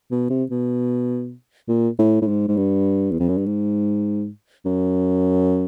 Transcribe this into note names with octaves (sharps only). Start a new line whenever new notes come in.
B2
C3
B2
A#2
A2
A2
G#2
G#2
G2
E2
F2
F#2
G2
G#2
F#2